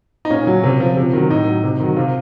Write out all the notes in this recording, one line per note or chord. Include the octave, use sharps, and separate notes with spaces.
D#4
A#2 C#4
F#3
C3
F3
C3
D#3 F#3
A2 D#4
F#3
C3
D#3 F#3
C3 F4